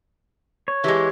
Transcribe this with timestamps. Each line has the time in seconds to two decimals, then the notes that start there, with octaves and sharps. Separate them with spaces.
0.68 C#5
0.84 E3 G#3 G4